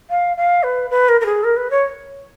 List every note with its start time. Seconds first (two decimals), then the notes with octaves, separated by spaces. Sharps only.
0.10 F5
0.37 F5
0.63 B4
0.90 B4
1.09 A#4
1.21 A#4
1.25 G#4
1.43 A#4
1.56 B4
1.70 C#5